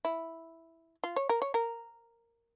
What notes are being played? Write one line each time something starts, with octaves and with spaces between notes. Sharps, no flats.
E4
F4
C#5
A#4
C#5
A#4